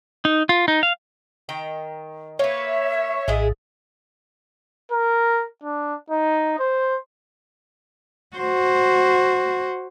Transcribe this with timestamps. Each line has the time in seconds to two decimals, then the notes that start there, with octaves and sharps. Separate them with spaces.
0.25 D#4
0.49 F4
0.68 D#4
0.83 F5
1.49 D#3 G5 A#5
2.39 A#3 B4 C#5 E5
3.28 A#1 A2 G#3 E4 G#4
4.92 A#4
5.63 D4
6.10 D#4
6.59 C5
8.36 F#4 C5